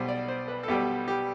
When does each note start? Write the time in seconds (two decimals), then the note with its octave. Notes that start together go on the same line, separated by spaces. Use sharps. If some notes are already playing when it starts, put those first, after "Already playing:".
Already playing: B1 B2 G3 C5
0.08 D5
0.28 C5
0.48 B4
0.63 A4
0.68 B1 B2 G3 G4
1.08 G4